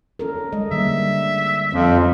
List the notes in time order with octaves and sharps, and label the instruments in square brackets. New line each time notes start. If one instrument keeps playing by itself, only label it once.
[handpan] C#4 A4 A#4
G#3 D#5
[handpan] D3 G3 A#3 [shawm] E5
[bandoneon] F2 [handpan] C#4